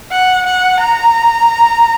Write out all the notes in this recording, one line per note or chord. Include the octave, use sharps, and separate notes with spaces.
F#5
F#5
A#5